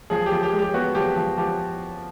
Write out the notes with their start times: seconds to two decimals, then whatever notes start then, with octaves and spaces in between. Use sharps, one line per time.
0.10 F3 G#4
0.26 G4
0.32 F3
0.43 G4
0.52 G#3
0.59 G4
0.74 B3 F#4
0.95 F3 G4
1.16 F3
1.38 F3 G4